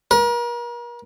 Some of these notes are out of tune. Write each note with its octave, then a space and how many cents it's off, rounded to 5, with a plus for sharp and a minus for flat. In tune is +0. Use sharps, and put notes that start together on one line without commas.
A#4 +40